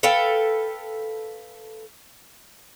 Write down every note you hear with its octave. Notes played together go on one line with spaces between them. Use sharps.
A4 B4 F5 G5